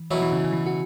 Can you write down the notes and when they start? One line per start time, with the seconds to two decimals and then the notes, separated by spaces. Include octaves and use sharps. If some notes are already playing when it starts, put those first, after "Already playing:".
Already playing: E3
0.11 B2 E3 F#3 E4
0.22 E3
0.32 C#3
0.44 C#3
0.53 E3
0.66 F#4